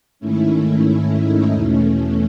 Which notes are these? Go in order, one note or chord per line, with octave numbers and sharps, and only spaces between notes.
G#2 D#3 A3 C#4 E4
C#4 E4
D#4
E2 B2 A3 C#4